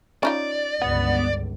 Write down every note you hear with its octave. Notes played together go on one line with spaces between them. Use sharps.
C#4 D#4 F4 D5
G1 C#2 B3